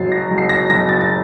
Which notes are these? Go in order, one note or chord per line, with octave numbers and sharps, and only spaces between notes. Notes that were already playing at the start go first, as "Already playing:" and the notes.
Already playing: F#1 F#3 A6 C7
A#6
F#1
C7
A#6
F#1 A#6
A6
A6